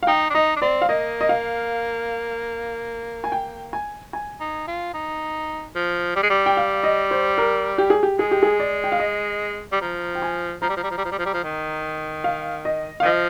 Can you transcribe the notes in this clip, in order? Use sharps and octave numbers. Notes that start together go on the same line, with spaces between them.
F5
D#4 G5
D4
D#4 D#5
D4
C4 D5
F5
A#3 D#5
D#5
F5
G#5
G5
G#5
G#5
D#4
F4
D#4
F3
G3
G#3
G3
G5
F5
D#5
C5
A#4
G4
G#4
G4
G#3 G#4
G4
G#4
D5
G5
F5
D#5
G3
F3 A#5
G5
G#5
F3 A#5
G3
F3
G3
F3
G3
F3
G3
F3
G3
F3
D#3
F5
D#5
D#3 F5
F3 D#5